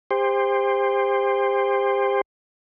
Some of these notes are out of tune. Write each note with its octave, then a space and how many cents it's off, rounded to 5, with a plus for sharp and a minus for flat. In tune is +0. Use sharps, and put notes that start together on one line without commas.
G4 +35 C5 +0